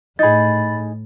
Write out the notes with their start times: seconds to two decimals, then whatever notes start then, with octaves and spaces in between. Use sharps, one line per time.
0.19 A2 D#4 G#4 B5 A6